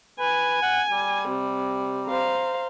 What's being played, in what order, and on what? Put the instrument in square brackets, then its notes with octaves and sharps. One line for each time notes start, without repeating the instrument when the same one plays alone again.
[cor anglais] B4 [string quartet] G#5
[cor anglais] F#5
G3
[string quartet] C3
C5 F5 A#5